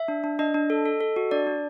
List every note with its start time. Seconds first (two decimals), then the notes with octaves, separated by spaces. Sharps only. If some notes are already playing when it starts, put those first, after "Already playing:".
Already playing: E5
0.08 D4
0.24 D4
0.39 D4 D#5
0.54 D4
0.70 A4
0.85 A4
1.01 A4
1.16 F#4
1.31 D4 D5
1.47 D4